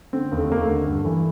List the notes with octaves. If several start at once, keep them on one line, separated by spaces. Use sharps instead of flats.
D3 C4
D#2
A3
D#2 A#3
A3
D3
G2
E3